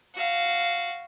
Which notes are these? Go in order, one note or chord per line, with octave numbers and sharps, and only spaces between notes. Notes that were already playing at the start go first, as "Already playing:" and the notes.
F#4 F5